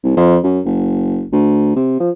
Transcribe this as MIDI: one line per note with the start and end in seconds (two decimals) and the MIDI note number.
0.03 0.14 36
0.17 0.38 41
0.44 0.60 42
0.65 1.24 30
1.32 1.73 38
1.76 1.99 48
2.00 2.10 53